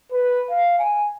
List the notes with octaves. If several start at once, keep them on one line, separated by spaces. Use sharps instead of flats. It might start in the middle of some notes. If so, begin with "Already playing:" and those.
B4
F5
G#5